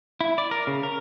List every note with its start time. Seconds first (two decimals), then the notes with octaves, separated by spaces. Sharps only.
0.21 E4
0.38 D5
0.51 A#4
0.67 C#3
0.83 A#4